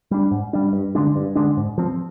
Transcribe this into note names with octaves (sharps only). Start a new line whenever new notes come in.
G3 D4
G#2
G3 D4
G2
D3 G#3 D4
G2
D3 G#3 D4
G#2
F3 C4